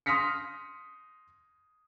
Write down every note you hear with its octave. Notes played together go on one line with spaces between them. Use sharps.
C6 D#6 F6 A#6 B6 C#7